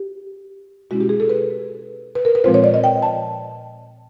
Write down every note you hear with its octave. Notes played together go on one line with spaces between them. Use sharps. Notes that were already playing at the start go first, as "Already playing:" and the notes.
Already playing: G4
B2 G#3 C#4 E4 F#4
G4
G#4
A4
B4
B4
A#4
B4
A#2 F3 G#3 C4 F4 C5
C#5
D5
D#5
G5
A5